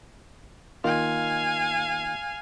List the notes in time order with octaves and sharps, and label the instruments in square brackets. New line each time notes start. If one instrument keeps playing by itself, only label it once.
[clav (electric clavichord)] D#3 A#3 F4 [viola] F5 G#5